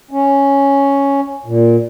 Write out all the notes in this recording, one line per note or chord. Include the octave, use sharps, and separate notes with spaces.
C#4
A#2